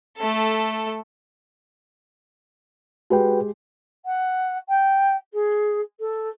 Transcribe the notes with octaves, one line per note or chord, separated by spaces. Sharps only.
A3 A4
G#3 F#4 G4 B4 G5
F#5
G5
G#4
A4